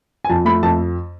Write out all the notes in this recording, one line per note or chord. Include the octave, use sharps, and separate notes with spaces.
G#5
F2 A5
A3 B5
F2 A5